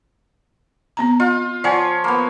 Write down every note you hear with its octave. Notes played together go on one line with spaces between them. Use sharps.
B3 C4 A#5
F4 D#5
F3 C#5 D5 F#5 G#5
A#3 B3